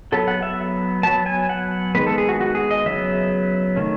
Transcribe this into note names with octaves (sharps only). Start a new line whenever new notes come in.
F#3 B3 A4
F#5
E5
F#3 B3 A5
G#5
F#5
D#3 G#3 B3 B4
A4
G#4
F#4
F#4
G#4
D#5
C#3 F#3 B3 E5
D#3 A3 C#4